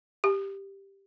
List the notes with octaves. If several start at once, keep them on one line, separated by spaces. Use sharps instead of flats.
G4